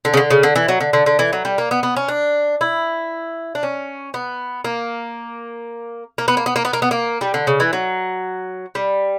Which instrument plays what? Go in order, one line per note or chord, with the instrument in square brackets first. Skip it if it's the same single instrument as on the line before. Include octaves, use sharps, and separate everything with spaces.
[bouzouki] D3
C#3
D3
C#3
D3
E3
F#3
D3
D3
D3
E3
F#3
G3
A#3
B3
B3
C#4
D4
E4
D4
C#4
B3
A#3
A#3
B3
A#3
B3
A#3
B3
A#3
B3
A#3
G3
D3
C#3
E3
F#3
G3